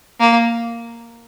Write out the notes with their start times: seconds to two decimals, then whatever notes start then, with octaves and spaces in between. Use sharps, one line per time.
0.20 A#3